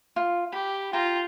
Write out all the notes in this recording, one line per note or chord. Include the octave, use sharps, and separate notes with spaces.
F4
G4 B5
F4 G5 A#5 C6